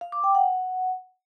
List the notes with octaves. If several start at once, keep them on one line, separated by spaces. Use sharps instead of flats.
F5
D6
G5
F#5